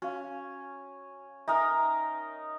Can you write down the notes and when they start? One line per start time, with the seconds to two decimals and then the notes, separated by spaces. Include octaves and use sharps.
0.02 C#4 F#4 F5
1.48 D#4 A#4 E5 G#5 D#6